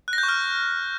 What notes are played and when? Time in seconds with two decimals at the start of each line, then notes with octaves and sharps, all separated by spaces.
0.08 F#6
0.13 A#6
0.18 G6
0.23 C#6
0.29 F6